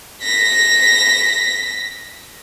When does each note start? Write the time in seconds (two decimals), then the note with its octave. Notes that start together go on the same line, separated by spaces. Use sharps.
0.23 A#6 B6